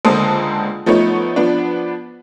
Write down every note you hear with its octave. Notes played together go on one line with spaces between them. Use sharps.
C#2 D3 A#3 C5 A5 D#6
F3 A3 B3 D#4 C#5
F3 B3 D4